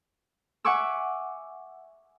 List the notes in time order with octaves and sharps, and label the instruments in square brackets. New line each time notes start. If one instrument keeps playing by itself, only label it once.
[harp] E5 F#5 G#5 C#6 D6 E6